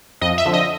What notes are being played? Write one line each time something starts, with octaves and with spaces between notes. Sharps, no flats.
F2 D#5
E5
D3 F3
D#5